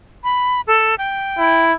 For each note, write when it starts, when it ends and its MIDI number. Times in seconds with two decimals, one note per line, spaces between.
0.24 0.61 83
0.67 0.95 69
0.98 1.65 79
1.38 1.73 64